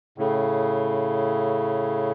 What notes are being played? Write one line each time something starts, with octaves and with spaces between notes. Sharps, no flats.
A2 C#3